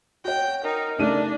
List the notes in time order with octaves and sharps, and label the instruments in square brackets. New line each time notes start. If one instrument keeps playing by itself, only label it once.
[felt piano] F#4 C#5 [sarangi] G5
[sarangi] D#4 [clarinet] A#4
[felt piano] C#3 G4 D#7 [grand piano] A3 D#4 [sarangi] D4